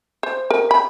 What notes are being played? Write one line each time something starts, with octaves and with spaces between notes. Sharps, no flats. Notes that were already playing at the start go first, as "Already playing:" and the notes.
C5
A#4
B5